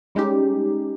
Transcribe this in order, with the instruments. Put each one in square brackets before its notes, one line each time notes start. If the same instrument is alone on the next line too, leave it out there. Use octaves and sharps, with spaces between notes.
[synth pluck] G3 G#3 C#4 D#4 G4